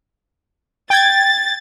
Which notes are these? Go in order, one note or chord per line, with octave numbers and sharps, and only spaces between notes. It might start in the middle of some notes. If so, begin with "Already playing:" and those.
G5 G#6 A6